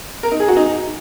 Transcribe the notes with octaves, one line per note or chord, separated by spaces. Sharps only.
A#4
D#4
G#4
F#4
D#4